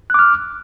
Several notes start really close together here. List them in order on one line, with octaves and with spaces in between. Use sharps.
F#6 D6 F6